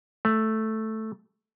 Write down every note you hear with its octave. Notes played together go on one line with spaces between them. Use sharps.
A3